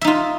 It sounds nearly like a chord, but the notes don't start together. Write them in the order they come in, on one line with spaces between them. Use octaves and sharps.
E5 D#4 F4